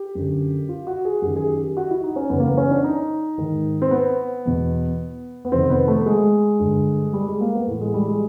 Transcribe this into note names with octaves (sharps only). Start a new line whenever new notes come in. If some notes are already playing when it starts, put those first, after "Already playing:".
Already playing: G4
F#2 D3
F4
F#4
G#4
F#2 D#3 G4
G#4
G4
F#4
E4
D#4
C#4
F#2 C#3 E3 B3
A#3
B3
C#4
D4
D#4
G#2 D#3
C4
B3
E2 B2
B3
F2 C3 D#3 C4
B3
A3
G#3
G2 D3
G3
G#3
A#3
B3
A2 E3 A3
G#3
G3
G#3